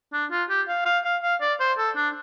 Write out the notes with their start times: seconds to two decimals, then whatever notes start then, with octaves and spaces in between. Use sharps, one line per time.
0.13 D4
0.31 F4
0.49 G4
0.68 F5
0.86 F5
1.04 F5
1.23 F5
1.41 D5
1.60 C5
1.78 A4
1.96 D4